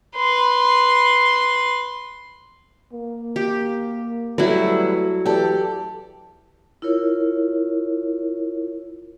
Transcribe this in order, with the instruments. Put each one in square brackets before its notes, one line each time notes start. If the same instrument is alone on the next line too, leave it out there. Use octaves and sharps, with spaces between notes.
[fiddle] B4 C6
[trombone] A#3
[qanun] G4
[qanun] F#3 E4 [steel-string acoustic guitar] G3 B4 [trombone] A3
[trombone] E3 [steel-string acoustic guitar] G4 A4 D5
[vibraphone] E4 F4 A#4 C#5